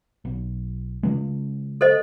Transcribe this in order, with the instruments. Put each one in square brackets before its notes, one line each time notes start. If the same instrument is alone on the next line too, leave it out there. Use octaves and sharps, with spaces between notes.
[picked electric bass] B1
C#3 G#3
[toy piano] A4 C5 D#5